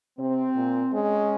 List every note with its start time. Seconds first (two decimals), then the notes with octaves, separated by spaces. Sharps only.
0.19 C3 C4
0.56 A#2
0.93 G#3 C#4